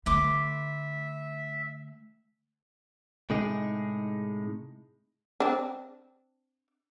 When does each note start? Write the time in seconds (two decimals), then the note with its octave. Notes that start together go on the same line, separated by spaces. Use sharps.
0.06 D3 A3 B4 E5 C6 D6
3.30 A2 C3 G#3 D#4 G#4
5.40 C4 D4